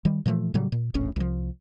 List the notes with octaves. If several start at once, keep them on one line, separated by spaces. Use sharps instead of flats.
D#3 G3
A#2 E3 F3 A3
A2 C#3 F#3 G3
A#2
E1 A#1 A2 C#4
C2 F3